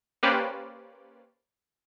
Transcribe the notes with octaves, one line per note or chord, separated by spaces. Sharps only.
A#3 C#4 G4 B4 C5 D5